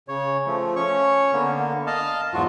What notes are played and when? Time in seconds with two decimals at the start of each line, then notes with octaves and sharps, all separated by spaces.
0.08 C#3 C#5
0.47 F3 A3
0.76 C#4 C#5 C#6
1.33 D3 A#3 B3
1.87 D#5 F5 A5
2.34 E2 G#2 F#3 F4 F#4